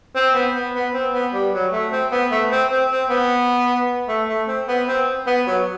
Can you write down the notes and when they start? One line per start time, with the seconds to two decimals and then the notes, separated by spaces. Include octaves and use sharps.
0.15 C4
0.34 B3
0.54 B3
0.74 B3
0.93 C4
1.13 B3
1.33 G3
1.53 F#3
1.72 A3
1.92 C4
2.11 B3
2.31 A3
2.51 C4
2.71 C4
2.90 C4
3.09 B3
4.08 A3
4.28 A3
4.47 C4
4.68 B3
4.87 C4
5.26 B3
5.47 F#3